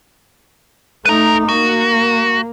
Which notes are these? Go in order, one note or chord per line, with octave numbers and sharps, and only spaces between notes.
A3 D#4 B4 A#5
A#3 F#4